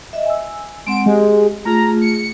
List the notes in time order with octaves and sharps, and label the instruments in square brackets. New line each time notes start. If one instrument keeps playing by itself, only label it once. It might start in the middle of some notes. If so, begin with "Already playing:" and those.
[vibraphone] D#5 E5
G#5 E6
[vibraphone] G#3 C4 F#5 [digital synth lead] D7
[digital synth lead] G#3 [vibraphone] G4
[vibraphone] A3 F4 G#4 [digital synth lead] A#5
[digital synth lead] C#7